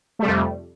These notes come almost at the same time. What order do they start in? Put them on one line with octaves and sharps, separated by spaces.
A3 G3 C3 F2